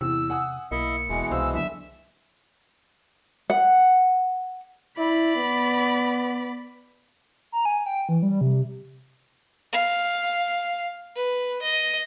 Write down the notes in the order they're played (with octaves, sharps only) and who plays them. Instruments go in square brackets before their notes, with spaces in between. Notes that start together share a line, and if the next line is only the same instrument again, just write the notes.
[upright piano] E2 [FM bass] C3 [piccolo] E6
[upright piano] F#5 G#5 D#6
[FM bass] B1 [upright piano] A#3 [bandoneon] E4 D#5 E5 [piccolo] C#7
[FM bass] E1 [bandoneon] B2 E3 G#3
[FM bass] C2 [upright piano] C5 F5 [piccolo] E6
[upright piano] F#1 D3 [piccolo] E5
[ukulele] F#5
[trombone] E4 [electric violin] D5 B5
[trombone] B3
[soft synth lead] A#5
G#5
G5
E3
G3
C3
[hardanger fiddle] F5
B4
D#5